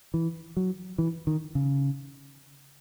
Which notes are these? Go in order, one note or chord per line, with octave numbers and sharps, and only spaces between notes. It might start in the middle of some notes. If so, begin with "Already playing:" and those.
E3
F#3
E3
D#3
C#3